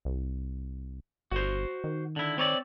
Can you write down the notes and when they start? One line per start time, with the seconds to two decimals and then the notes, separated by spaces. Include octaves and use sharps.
0.05 C2
1.32 G1 F#4 C5
1.84 D#3
2.16 D3 E4
2.38 C4 C#5 D5